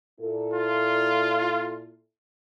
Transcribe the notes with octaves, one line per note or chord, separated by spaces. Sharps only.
A#2 E4 A4
F4